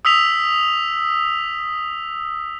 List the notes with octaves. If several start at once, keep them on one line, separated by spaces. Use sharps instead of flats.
D#6 E6 B6 F7